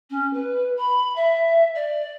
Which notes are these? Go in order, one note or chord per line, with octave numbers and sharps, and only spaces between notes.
C#4
B4
B5
E5
D5